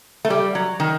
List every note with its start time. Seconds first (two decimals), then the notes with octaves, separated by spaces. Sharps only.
0.25 A3
0.30 G3
0.55 F#3
0.80 D#3